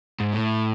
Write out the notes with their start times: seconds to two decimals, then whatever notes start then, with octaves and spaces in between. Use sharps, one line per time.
0.20 G#2
0.33 A2